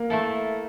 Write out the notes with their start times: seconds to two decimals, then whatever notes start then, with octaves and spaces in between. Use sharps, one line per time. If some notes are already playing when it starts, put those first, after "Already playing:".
Already playing: A#3
0.10 A3 E4 A4